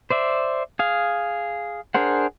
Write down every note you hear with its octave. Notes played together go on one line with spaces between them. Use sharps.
C5 D5 E5
G#4 F5
D4 G#4 A#4 C5 F#5